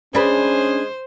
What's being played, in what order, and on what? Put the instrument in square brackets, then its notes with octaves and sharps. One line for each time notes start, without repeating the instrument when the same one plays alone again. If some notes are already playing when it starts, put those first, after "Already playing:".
[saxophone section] G#3 G#4 [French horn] C#4 [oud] D4 B4 [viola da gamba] C5